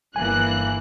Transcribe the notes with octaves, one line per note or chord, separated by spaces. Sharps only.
G1 E3 A#3 G#5 F#6